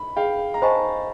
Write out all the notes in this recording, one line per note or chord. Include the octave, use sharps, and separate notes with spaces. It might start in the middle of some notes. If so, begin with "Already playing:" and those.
Already playing: B5
G#4 F5 G5
A#5
C5 D#5 G#5 A5 B5 C#6